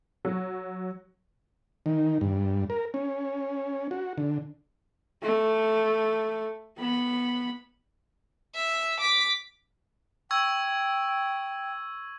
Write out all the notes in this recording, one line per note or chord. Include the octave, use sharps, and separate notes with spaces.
F#3
D#3
G2
A#4
C#4
F#4
D3
A3
B3 B5
E5
D6 B6
G5 C#6 E6 G#6